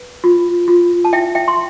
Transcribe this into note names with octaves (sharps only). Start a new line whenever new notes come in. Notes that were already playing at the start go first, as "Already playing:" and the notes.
Already playing: B4
F4
F4
A5
E4 E5 G5
E5 G5
C6